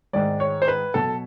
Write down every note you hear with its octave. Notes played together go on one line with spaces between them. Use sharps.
G#2 D#3 G#3 D5
C#5
C5
B4
B2 F#3 A4